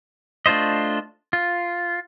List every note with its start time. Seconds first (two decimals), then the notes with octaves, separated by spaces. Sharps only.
0.46 A3 D4 F4 C5 D#5
1.33 F4